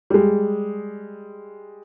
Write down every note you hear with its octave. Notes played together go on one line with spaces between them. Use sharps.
G3 G#3